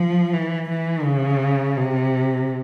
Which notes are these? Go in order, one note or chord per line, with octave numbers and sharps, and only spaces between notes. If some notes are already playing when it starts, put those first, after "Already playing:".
Already playing: F3
E3
E3
C#3
C3